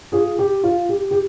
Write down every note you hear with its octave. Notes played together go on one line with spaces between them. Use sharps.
F4 G#4
G4
F4
G4
G4